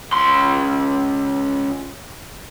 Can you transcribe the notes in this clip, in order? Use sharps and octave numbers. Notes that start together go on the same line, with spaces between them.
C#2 C6